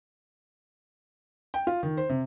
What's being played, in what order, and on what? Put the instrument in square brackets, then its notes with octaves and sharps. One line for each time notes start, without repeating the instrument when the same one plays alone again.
[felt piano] G5
F4
D#3
C5
C3